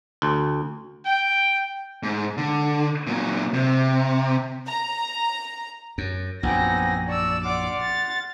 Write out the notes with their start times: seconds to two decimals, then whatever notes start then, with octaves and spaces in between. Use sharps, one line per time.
0.22 D2
1.06 G5
2.03 G#2
2.38 D3
3.07 A#2 F#3
3.54 C3
4.68 A#5
5.98 F#2
6.43 A#1 F#2 B3 C4 D#4 G#5 A#6
7.08 D5 A5 C#6 E6
7.45 D5 F#5 C6 D6 F6
7.81 A6